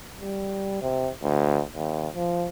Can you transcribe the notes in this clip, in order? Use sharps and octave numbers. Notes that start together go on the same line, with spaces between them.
G3
C3
D2
D#2
F3